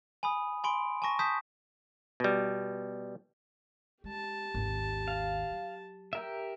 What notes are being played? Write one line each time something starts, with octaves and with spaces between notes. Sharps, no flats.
G#5 B5 D#6
G#5 B5 C6 D7
G#5 A5 C#6 A#6
A5 D#6 G6 B6
B2 G3
G#3 G4 A5
G#1 D#2
F5
F#3
G4 A#4 E5